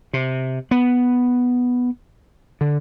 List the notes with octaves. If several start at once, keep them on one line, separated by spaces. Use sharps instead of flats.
C3
B3
D3